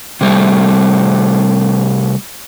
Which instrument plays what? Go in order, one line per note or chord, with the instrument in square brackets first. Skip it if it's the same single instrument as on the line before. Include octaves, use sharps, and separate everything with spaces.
[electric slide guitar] C3 G3 A3